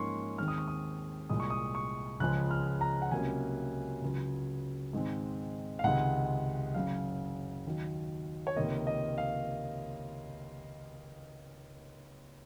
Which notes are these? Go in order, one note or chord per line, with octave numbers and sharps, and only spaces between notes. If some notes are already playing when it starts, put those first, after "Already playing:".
Already playing: G#2 F3 A#3 C#4 C6 C#6
D#2 D#3 G#3 C4 F6
D#6
C#6
D#6
C2 A#2 G#3 D#6
C#6
D#6
C#6
C#2 C#3 F3 G#3 C#4 F#6
F6
A#5
F#5
C#2 C3 F#3 A#3 C#4 G#5
C#2 C#3 F#3
G#2 D#3 G#3 C4
F5
C#2 C3 D#3 G#3 F#5
F#1 F#2 C#3 F5
D#2 D#3 F#3
C#5
C#2 C3 D#3 A#3 D#5
D#5
F5